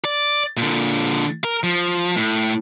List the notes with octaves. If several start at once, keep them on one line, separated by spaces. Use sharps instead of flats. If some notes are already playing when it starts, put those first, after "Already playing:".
D5
A#2 D3
A#4
F3
A2